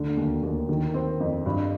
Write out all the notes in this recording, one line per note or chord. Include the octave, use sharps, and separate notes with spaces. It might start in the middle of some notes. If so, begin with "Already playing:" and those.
Already playing: D2 D3
D#2
D#2
D#3
C4
F2
G2